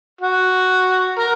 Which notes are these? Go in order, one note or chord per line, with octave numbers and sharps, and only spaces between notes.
F#4
A#4